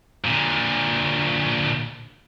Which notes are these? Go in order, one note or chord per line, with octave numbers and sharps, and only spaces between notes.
A#2 D3